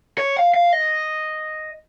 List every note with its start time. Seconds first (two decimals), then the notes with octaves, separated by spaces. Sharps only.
0.18 C#5
0.37 F5
0.54 F5
0.73 D#5